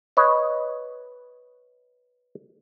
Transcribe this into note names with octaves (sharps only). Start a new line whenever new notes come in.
B4 C#5 D#5